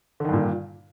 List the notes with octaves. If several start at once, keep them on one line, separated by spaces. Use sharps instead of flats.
G2 A#2 D3 D#3